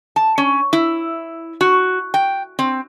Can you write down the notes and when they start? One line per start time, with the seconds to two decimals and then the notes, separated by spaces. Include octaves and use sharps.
0.16 A5
0.38 C#4
0.73 E4
1.61 F#4
2.14 G5
2.59 C4